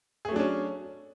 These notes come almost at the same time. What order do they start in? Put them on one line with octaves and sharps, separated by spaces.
G#4 A3 F#3 D4 C#4